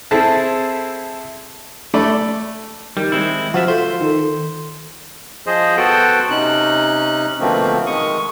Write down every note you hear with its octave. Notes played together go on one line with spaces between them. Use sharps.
C4 E4 G#4 A4 E5 A5
A3 D5 B5
D#3 G3
G#3 C4 E4
F3 F4 F#4 C5 E5
F4 A4 C5
D#3
F3 G#4 C5 D#5
B3 F#4 A4 C5 F#5 G5
C3 C#4 D#4 F#6
B2 D3 F3 A3 A#3 C4
D#3 G#3 C#6 D#6